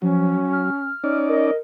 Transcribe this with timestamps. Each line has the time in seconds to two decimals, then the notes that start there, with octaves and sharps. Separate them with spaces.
0.02 F3 F#3 C#4
0.53 F6
1.04 C#4 D#4 D5
1.29 A#4 D#5